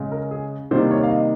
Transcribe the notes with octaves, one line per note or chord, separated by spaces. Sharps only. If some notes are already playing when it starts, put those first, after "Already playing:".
Already playing: C#3 G#3
A#4
G#4
C3 D#3 G3 A#3 C5
C#5
F5
D#5